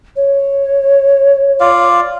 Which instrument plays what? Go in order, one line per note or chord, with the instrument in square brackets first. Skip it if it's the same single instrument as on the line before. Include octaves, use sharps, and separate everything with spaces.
[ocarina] C#5
[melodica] F4 D5 F5